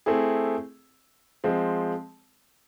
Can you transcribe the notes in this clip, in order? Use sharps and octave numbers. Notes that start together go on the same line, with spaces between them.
A3 C4 E4 G#4
F3 G#3 C4